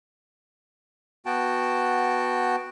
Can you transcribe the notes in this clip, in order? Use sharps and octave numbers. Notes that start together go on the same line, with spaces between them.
B3 F#4 G5 A5